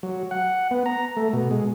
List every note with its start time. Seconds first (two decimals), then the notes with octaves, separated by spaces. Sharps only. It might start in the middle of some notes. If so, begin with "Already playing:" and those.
0.03 F#3
0.31 F#5
0.71 B3
0.86 A#5
1.17 A3
1.33 B2
1.51 G#3